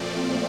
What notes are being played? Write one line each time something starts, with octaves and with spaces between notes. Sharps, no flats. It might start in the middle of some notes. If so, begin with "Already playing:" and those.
Already playing: A#2 F3 A3 C4 D5